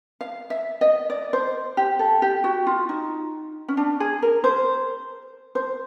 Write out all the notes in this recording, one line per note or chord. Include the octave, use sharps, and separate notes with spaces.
F5
E5
D#5
D5
C5
G4
A4
G4
F#4
F4
D#4
C#4
D4
G#4
A#4
C5
C5